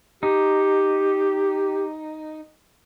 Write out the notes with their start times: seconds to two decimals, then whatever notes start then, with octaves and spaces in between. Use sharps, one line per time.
0.23 D#4 G4